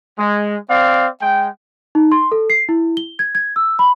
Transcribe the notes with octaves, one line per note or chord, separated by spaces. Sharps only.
G#3
C4 D5 F5
G#3 G5
D#4
C6
A4
C7
E4
G7
G#6
G#6
E6
B5